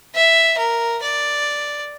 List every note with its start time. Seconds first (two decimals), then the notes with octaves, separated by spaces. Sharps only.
0.15 E5
0.58 A#4
1.02 D5